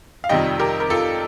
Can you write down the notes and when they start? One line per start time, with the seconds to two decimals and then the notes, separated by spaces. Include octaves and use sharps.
0.24 F5
0.29 F2 C3 D#3 G3 D#5 G5
0.59 G4 A#4
0.80 A#4
0.90 F4 A4